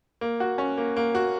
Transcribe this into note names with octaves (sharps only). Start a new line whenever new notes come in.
A#3
F#4
C#4
A#3
A#3
F#4